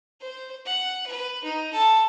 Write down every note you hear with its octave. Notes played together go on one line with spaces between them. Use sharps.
C5
F#5
B4
D#4
A4